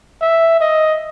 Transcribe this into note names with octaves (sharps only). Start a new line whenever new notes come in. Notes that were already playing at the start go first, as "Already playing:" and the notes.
E5
D#5